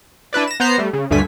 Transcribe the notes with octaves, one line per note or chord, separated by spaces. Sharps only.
D4 E4 B4 D5
A#6 E7
B3 C5 A#5 C7
G3 A3
C#3
D2 G2 D3 A3 G#5 B6